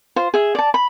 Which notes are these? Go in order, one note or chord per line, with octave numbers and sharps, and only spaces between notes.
F4 C5
G#4 E5
D5 A5
B5